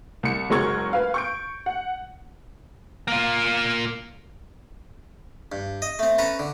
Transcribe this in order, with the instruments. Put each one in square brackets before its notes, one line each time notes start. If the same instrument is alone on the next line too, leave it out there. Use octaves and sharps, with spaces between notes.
[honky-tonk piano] C2 C#7
F#1 F#3 G#3 A#4 C#6 G#6
B4 F5
C#6 G6 D7
F#5
[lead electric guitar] A#3 F4
[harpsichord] G2
D#5
A3 C4
C#4 A4 B4 A#5
D3